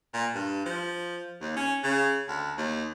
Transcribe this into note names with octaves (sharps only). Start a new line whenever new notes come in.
A#2
G2
F3
D#2
C#4
C#3
D2
D#2